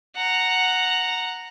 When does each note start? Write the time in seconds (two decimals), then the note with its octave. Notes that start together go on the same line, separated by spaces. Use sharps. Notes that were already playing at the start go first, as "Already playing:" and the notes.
0.16 F#5 A#5